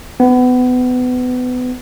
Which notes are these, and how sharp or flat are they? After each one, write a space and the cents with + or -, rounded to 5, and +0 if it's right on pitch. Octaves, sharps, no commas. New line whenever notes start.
B3 +25